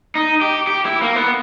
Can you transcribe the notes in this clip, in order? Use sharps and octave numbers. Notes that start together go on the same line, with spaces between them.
D#4
G4
G4
E4
A#3
B3